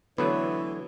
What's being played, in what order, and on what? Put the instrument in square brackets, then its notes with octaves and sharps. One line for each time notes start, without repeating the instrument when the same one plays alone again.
[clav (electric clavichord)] D3 F#3 A3 [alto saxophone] E3 [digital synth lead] B3 [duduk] C#5